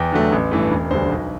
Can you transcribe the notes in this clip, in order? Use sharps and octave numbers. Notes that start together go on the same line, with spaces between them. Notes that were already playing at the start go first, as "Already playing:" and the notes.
Already playing: E2 G5
D3 F#3 A3
A1
G2 E3 A3
E1
D2 D3 G3 C5
B1